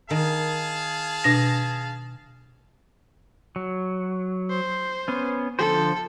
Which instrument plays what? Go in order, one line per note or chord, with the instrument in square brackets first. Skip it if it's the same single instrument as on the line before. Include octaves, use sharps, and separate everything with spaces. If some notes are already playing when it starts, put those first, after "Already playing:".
[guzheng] D#3 [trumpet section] G#4 F5 A5
[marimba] B2 D4 A#6
[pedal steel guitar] F#3
[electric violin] C5
[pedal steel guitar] B3 C#4
[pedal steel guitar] D3 F3 C5 [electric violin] A4